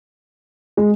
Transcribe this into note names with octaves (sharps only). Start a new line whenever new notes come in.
G#3